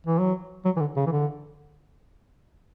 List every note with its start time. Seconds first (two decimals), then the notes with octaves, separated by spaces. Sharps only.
0.06 E3
0.19 F#3
0.65 F#3
0.77 E3
0.80 D3
0.96 C#3
1.06 E3
1.11 D3